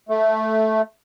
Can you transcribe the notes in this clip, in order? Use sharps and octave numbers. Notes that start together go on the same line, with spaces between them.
A3